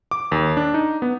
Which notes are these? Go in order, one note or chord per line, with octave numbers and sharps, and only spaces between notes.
D6
D#2
D4
D#4
B3